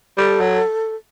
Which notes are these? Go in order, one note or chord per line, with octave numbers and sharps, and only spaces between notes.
G3 A4
F#3